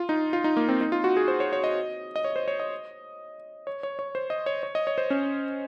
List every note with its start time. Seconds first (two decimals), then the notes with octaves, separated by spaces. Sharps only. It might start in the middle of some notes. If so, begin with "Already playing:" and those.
Already playing: F4
0.09 D#4
0.33 F4
0.44 D#4
0.57 A#3
0.69 C4
0.81 D#4
0.92 F4
1.04 F#4
1.17 G#4
1.28 C5
1.40 C#5
1.53 C#5
1.64 D#5
2.16 D#5
2.24 C#5
2.36 C5
2.48 C#5
2.60 D#5
3.67 C#5
3.83 C#5
3.99 C#5
4.15 C5
4.30 D#5
4.46 C#5
4.63 C#5
4.75 D#5
4.87 C#5
4.98 C5
5.10 C#4